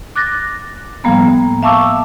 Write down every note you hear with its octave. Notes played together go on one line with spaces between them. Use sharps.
D6 F#6 A6 A#6
A2 F3 G3 A#3 B3
E5 F5 A5 C#6 D6 E6